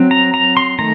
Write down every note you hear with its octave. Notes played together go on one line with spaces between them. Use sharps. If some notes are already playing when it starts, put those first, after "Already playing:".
Already playing: F#3 C4
A#5
A#5
C6
D#3 A3 A#5